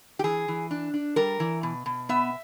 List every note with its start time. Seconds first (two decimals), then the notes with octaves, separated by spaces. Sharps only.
0.19 G4
0.24 E3 G#4
0.48 E3
0.71 D4
0.94 D4
1.16 G3 A#4
1.40 E3
1.63 B2
1.86 B2
2.09 B3 E5